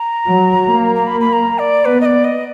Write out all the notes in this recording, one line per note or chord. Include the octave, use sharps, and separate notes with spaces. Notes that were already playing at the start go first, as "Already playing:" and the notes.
Already playing: A#5
F#3
A#3
A#5
B5
B5
A#5
D5
B3 B4
D#5
D5
D#5